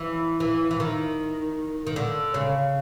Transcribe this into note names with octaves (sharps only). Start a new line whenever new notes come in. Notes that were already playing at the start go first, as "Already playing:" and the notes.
Already playing: E3
E3
E3
D#3
D#3
D3
C#3